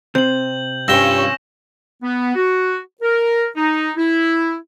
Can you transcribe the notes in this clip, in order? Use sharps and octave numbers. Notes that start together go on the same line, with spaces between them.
C3 C4 G6 F#7
G2 C#4 F4 G5 E6 A#6 E7
B3
F#4
A#4
D#4
E4